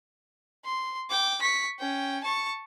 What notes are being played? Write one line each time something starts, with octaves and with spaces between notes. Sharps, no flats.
C6
G5 D6
C#6 B6
C#4 G5
A5 C#6